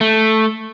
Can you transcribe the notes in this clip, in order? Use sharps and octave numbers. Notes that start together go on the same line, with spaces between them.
A3